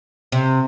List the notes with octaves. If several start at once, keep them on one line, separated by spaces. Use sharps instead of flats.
C3